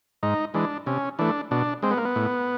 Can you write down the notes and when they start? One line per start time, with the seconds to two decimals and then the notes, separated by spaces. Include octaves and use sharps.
0.23 G#2 D#4
0.54 E3 G#3 D4
0.86 C3 C#4
1.19 E3 A3 D4
1.51 B2 D4
1.83 G#3 C4
1.91 B3
1.97 A#3
2.05 B3
2.16 A2